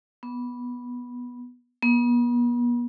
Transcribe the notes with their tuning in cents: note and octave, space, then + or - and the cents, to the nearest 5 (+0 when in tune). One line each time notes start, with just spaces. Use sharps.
B3 -10
B3 -40